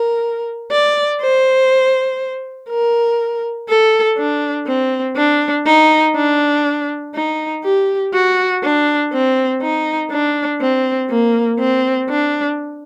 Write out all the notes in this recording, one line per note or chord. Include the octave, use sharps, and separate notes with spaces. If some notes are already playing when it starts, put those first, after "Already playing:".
Already playing: A#4
D5
C5
A#4
A4
D4
C4
D4
D#4
D4
D#4
G4
F#4
D4
C4
D#4
D4
C4
A#3
C4
D4